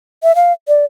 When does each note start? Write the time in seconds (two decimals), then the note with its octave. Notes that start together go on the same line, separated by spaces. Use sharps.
0.23 E5
0.36 F5
0.68 D5